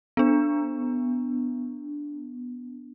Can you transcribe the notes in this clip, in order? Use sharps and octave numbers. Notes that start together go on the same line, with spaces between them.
B3 D4